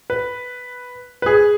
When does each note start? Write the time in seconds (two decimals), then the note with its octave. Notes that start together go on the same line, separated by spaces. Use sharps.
0.10 B4
1.22 B4
1.26 G#4